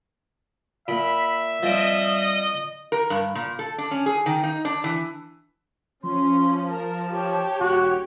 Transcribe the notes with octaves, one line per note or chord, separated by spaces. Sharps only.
A#2 E5 B5
F3 G3 C4 D#5
A#4
G2
A#2
A4
D4
C#4
G#4
D#3
D#4
D4
E3
F3 C#4 C6
A#4 A5
G4 C#5
E1 F#4 F#5